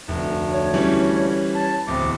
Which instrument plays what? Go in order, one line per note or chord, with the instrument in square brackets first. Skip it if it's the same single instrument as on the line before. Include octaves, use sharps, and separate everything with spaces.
[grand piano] F1 [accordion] D2 A3
[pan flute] C#5
[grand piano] E3 G3 C#4
[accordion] A5
[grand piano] D1 E2 [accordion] C4 D6